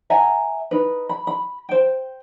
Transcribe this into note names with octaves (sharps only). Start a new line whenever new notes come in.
E5 F#5 G#5 A#5
D#4 B4
B5
B5
C5 G5